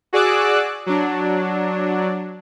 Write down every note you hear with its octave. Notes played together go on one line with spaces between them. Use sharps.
F#4 G#4 D5 D6 E6 F#6
F#3 D4